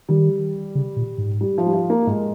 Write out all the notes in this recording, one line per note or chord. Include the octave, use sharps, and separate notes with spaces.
D#3 G3
C#3
A#2
G#2
G3
F3
G3
F3
A#3
G#2 G#3